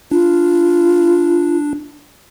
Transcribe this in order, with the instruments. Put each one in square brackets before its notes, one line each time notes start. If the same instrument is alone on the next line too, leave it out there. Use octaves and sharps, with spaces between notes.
[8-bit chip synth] D4 [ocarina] F4